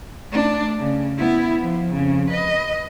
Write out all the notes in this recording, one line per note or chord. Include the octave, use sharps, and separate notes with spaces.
A3 D4
C#3
B3 E4
F3
F2 C#3
B4 D#5